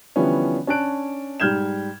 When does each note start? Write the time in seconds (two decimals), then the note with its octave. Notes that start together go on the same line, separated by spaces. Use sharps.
0.16 D3 E3 F3 G3 B3 C#4
0.67 C#4 D4 A5 F#6 D7
1.40 G#2 G3 F6 G6 G#6 E7